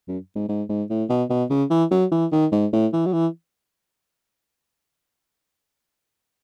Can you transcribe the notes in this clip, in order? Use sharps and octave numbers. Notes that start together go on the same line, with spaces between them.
F#2
G#2
G#2
G#2
A2
B2
B2
C#3
E3
F#3
E3
D#3
G#2
A2
E3
F#3
E3